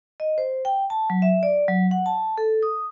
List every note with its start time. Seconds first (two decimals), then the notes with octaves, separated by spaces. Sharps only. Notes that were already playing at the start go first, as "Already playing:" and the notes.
0.20 D#5
0.38 C5
0.65 G5
0.90 A5
1.10 F#3
1.22 E5
1.43 D5
1.68 F#3
1.91 F#5
2.06 A5
2.38 A4
2.63 D#6